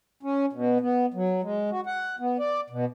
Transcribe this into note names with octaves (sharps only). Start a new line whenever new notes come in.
C#4
B2
B3
F#3
G#3
F#4
F#5
B3
D5
B2